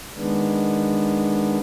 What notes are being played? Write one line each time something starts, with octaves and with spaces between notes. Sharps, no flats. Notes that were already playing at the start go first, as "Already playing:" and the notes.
D#3 G#3 B3 D4